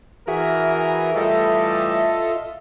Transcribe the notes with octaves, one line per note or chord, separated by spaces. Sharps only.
E3 F#4 G#4 A#4 E5
A2 E3 G3 F4 A4 D#5